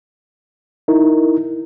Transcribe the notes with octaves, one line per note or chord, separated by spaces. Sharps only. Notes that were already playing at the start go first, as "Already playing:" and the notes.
D#4 E4 A#4